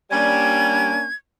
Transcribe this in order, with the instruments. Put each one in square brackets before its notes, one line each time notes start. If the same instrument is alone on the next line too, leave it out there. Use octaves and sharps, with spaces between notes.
[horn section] G3 [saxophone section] A#3 C#4 D4 [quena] G#6